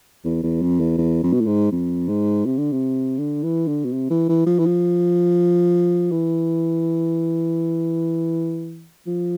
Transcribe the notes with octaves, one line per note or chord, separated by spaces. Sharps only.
E2
E2
F2
E2
E2
F2
B2
A2
G#2
F2
G#2
C3
D3
C3
D3
E3
D3
B2
C3
E3
E3
F3
E3
F3
E3
F3